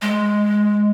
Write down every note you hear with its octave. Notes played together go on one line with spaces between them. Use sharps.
G#3